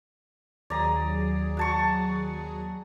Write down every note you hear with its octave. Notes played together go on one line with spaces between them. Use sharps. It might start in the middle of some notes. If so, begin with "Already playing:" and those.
D#2 F#3 G#4 D5 A#5
F#5 A5 C#6